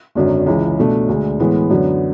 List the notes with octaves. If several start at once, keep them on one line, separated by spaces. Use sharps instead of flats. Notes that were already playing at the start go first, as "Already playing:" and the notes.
G#1 F#2 D3 F#3
C#2 C#3 E3
B1 B2 A3 D4
D2 D3 G#3
A2 E3 G#3 B3 E4
F#2 D3 F#3 B3